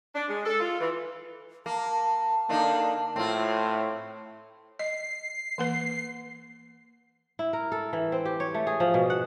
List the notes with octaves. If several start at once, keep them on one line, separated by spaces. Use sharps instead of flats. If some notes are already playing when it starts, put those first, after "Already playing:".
D4
G#3
A4
F4
E3
A#3 A5
D3 A#3 D4 D#4
A2 C4 F4
D#5 C7
E3 A#3 B4
E4
A#4
A4
E3
C4
G4
C#5
A3
G#4
F3
B2
F#5